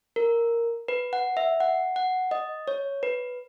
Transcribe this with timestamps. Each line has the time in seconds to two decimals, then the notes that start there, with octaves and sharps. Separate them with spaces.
0.16 A#4
0.88 B4
1.13 F#5
1.37 E5
1.60 F#5
1.96 F#5
2.31 D#5
2.68 C#5
3.03 B4